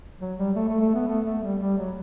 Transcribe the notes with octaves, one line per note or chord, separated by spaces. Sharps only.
F#3
G3
A3
A3
A3
B3
A3
A3
G3
G3
F#3